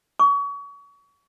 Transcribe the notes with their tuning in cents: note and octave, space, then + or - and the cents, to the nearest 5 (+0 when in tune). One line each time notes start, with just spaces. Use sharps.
C#6 +35